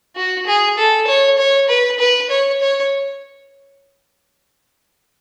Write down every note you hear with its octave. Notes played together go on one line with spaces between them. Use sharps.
F#4
G#4
A4
C#5
C#5
B4
B4
C#5
C#5